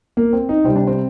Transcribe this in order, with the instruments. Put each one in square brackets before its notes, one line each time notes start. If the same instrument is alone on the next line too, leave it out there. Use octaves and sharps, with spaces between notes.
[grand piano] A#3
C4
D#4
C3 G3 C4
D4
C4